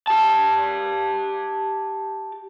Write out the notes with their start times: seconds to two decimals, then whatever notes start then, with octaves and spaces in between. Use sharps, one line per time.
0.07 G4 A5